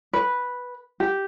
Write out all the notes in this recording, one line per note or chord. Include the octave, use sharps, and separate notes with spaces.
B4
G4